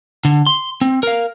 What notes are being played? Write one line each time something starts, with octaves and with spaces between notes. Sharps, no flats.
D3
C6
C4
A#4 F5